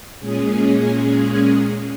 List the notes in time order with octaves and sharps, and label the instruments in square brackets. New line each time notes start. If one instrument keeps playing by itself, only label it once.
[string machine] A#2 G#3 C#4 G#4